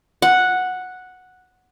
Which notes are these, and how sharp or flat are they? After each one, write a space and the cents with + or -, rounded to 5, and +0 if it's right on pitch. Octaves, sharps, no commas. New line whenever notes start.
F#5 -5